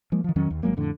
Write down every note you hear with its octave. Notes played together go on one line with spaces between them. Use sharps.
F3 G#3 A#3
D#3 F3
F2 D#3 F#3 C#4
D#2
G#1 F#3 G#3 A#3
F2 A2 D3